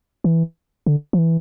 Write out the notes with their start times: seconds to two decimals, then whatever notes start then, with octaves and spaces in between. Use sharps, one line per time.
0.24 E3
0.86 D3
1.13 F3
1.18 E3